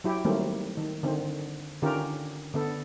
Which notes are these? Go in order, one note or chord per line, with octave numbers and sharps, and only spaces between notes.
F#3 E4 G4
D#3 F#3 G3 A3 A#3 C4
D#3
D3 D#3 C4
D3 D#3 C#4 F4 G4 A#4
D3 B3 A4